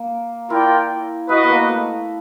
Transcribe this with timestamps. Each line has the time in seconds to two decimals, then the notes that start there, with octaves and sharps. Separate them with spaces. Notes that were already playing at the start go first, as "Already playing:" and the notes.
Already playing: A#3
0.49 E4 F4 A#4 D5 G5
1.29 E4 F#4 B4 D#5
1.44 B3
1.50 A#3
1.68 A3